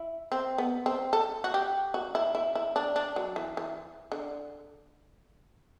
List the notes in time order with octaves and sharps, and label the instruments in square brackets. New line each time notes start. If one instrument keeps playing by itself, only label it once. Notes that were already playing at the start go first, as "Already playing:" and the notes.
Already playing: [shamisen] E4
C4
B3
C4
A4
F#4
G4
F#4
E4
E4
E4
D4
D4
F#3
E3
E3
D3